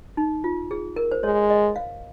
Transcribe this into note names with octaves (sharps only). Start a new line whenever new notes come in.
D#4
F4
G#4
A#4
C5
G#3 C#5
D#5
F5